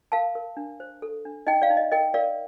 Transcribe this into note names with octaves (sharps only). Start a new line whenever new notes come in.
A#4 F5 A5
A#4
D4
C5
A4
D4
D#4 D#5 G5
D5 F5
D#4
D#5
A#4 D#5 G5
A#4 D5 F5